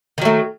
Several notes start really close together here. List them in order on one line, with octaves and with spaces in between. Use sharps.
D#3 F#3 A3